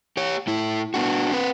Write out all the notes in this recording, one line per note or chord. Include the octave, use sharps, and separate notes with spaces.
G4 C#5
A2 E4
B3 D4 F#4
C4 B4